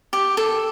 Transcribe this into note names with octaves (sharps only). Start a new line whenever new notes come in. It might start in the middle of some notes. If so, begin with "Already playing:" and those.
G4
A4